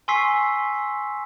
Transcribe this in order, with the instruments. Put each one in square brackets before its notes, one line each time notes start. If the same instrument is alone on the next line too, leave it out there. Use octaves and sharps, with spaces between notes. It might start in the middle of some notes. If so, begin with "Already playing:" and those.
[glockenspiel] G#5 C6 C#6 E6 B6 C7